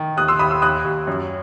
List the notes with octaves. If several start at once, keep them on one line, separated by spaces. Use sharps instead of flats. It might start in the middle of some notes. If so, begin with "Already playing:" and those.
Already playing: D#3
D#2 D#6 F#6
C6 E6
D#2 B5 D#6
C6 E6
D#2 D#6 F#6
D#2
F#2